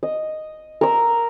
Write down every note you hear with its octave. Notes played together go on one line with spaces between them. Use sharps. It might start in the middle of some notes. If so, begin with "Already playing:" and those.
D#5
A#4 E6